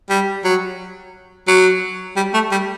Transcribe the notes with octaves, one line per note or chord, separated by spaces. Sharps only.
G3
F#3
F#3
G3
A3
G3